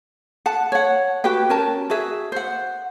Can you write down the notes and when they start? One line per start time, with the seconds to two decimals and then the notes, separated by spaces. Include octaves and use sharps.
0.46 F#5 A5
0.72 C#5 F#5
1.24 F#4 G4 B4 G5
1.49 C#4 A#4 A5
1.90 F#4 G#4 E5
2.32 C5 F#5